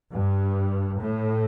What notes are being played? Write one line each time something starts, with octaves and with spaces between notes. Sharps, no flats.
G2
A2